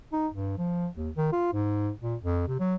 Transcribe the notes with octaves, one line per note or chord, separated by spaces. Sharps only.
D#4
G2
F3
D#2
D#3
F4
G#2
A#2
F2
C3
F#3